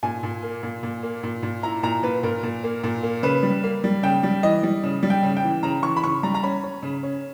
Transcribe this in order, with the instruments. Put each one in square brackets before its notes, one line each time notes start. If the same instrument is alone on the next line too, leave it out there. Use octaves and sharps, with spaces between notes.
[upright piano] A#2 G#5
A#2
A#3
A#2
A#2
A#3
A#2
A#2
E4 A#5
A#2 A#5
A#2 B4
A#2 A#4
A#2
A#3
A#2
A#3
C#3 B4
G3
A#3
G3
C#3 G5
G3
E3 D#5
G3
C#3
G3
G5
C#3
G5
E3
C#3 A#5
E3 C#6
B5
C#3 C#6
G3 A#5
A#5
C#4 B5
C#4
C#3
C#4